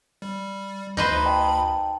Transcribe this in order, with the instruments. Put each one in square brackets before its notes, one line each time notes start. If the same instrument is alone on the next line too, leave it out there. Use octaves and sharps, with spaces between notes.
[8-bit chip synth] G3
[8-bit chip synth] D2 B5 [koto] D#4 B4 C5
[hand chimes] D#5 G5 A5